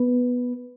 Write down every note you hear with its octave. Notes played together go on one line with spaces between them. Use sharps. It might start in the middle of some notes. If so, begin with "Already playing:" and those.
Already playing: B3